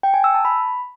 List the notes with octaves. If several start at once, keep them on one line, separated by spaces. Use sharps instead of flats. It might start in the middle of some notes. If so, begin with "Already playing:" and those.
G5
G#5
E6
A5
B5